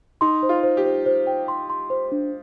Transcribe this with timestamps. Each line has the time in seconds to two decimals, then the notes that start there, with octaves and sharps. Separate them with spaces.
0.21 D#4 C6
0.43 C5
0.49 F4
0.63 C5
0.77 G4
0.85 C5
1.06 C5
1.27 G5
1.48 C6
1.70 C6
1.90 C5
2.12 D4